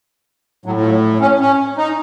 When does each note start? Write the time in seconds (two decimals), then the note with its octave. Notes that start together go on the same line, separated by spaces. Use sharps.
0.66 A2 F#3
0.80 F3
0.85 F#3
1.21 C#4
1.41 C#4
1.77 D#4